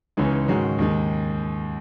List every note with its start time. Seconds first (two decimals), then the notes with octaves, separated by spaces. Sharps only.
0.17 C#2 C#3 E3 G#3 D#4
0.48 G#2 D#3 G#3 C#4 F#4
0.78 D#2 D#3 G#3